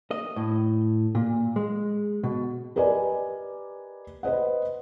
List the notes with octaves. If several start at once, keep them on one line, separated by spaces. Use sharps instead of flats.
D#5
A2
A#2
G#3
B2
G4 A#4 B4 D5 D#5 G#5
B4 C5 D#5 F#5